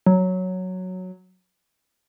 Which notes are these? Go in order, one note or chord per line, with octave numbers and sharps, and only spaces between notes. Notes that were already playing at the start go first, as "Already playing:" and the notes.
F#3